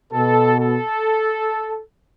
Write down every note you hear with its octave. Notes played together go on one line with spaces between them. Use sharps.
B2 A4
A4